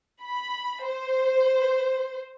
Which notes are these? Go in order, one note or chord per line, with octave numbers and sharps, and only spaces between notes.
B5
C5